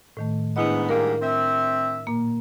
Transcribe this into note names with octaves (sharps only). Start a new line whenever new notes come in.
A2 D#3 A3
G#2 B3 D4 E4 D#5
G#2 G3 A#3 A#4
C4 E5
A#2 A#3